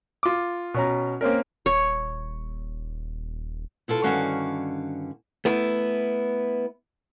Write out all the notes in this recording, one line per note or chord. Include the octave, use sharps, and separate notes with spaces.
F4 D6
B2 C#4 A#5
A#3 C4 C#4 A#4
D#1 C#5
B2 E4 F4 A4
G2 D3 D#3 C#4 F#4 F5
A3 B3 E4